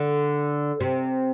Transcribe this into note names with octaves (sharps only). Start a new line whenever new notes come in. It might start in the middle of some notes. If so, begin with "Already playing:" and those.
Already playing: D3
C3